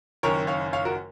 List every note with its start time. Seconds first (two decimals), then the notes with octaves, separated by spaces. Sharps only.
0.23 F#1 F#2 D#3 A#4 C#5
0.47 C#5 F5
0.73 C#5 F5
0.85 F#4 A#4